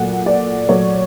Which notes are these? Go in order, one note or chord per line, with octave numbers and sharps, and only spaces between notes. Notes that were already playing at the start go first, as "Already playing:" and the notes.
Already playing: A#2 F#3 A3 F#5
D5
A#2 F#3 A3 C#5